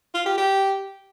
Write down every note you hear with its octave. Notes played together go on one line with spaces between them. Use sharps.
F4
G4
G4